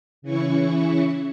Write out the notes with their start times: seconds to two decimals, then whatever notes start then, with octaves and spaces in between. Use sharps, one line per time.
0.22 C#3 E3 C#4 E4 C#6